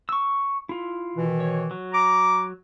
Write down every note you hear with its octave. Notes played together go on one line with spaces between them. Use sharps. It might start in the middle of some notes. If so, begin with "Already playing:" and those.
C#6 E6
E4 F4
B2 D#3 E3
C#5
F#3
A#5 D6